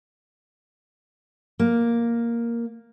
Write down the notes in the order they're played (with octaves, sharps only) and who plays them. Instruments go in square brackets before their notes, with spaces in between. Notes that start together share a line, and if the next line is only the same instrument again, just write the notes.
[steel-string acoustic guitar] A#3